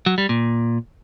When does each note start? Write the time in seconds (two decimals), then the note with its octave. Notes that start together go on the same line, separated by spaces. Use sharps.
0.06 F#3
0.18 G3
0.29 A#2